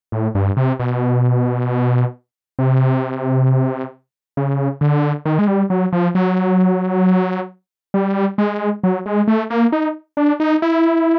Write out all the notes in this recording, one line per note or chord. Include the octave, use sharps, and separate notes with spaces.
A2
G2
C3
B2
C3
C#3
D3
D#3
G#3
G3
F#3
F3
F#3
G3
G#3
F#3
G#3
A3
A#3
D#4
D4
D#4
E4